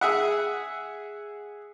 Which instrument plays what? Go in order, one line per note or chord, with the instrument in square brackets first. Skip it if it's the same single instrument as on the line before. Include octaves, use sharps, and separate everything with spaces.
[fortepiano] G#4 E5 F#5